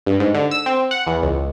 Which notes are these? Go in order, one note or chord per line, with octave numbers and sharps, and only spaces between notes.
G2
G#2
D3
E6
C4
F#5
E2
C#2